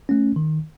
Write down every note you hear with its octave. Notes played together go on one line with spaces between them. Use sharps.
A3 C#4
D#3